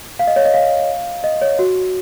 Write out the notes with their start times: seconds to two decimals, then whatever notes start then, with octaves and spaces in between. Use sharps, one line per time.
0.19 F5
0.27 D#5
0.36 C#5
0.45 D#5
0.54 F5
1.24 D#5
1.42 C#5
1.59 F#4